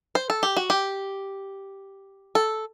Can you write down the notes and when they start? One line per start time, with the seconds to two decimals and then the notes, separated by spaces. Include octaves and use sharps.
0.15 C5
0.30 A4
0.43 G4
0.57 F#4
0.70 G4
2.35 A4